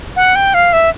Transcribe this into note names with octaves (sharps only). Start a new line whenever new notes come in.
F#5
G5
F5
E5